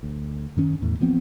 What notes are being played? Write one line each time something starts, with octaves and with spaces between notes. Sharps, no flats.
D2
F#2 D#3 C#4
E2 A2
E3 F3 B3 C4